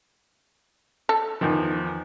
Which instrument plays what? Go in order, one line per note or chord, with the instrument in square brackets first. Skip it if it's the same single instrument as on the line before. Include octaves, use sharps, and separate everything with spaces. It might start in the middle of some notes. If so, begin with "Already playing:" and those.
[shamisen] A4
[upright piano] E2 D#3 F3